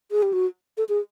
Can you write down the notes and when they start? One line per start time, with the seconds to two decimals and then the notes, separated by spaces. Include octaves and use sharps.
0.11 G#4
0.22 G4
0.33 F#4
0.77 A4
0.89 G#4